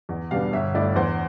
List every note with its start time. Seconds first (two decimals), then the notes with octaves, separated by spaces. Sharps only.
0.09 E2
0.31 B2 G3 B3 D4 F5
0.53 G1 E5
0.74 G2 D3 A3 E4 D5
0.96 E2 C5